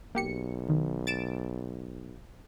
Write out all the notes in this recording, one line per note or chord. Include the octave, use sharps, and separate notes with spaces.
B1 A#3 G4 C#7
D#3
A6 D7 E7